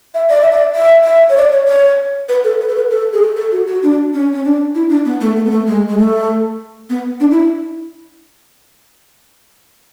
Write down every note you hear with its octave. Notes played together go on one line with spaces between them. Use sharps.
E5
D5
E5
D5
E5
E5
C#5
D5
C#5
C#5
B4
A4
B4
A4
B4
A4
G#4
A4
A4
F#4
F#4
D4
C#4
C#4
D4
E4
D4
B3
A3
A3
B3
A3
G#3
G#3
A3
B3
D4
E4